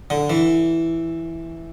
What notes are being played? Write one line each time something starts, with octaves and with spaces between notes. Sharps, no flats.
D3
E3